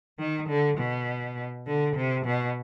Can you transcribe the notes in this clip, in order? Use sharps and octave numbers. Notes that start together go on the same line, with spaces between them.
D#3
D3
B2
D3
C3
B2